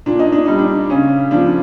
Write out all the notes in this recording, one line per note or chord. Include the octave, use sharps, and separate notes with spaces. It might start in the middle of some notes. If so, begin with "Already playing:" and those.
A#2 D4
D#4
D4
G3 D#4
D4
C#3 C#4
F3 D4